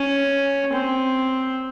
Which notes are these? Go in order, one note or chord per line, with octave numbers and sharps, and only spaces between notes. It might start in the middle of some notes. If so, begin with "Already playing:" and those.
Already playing: C#4
C4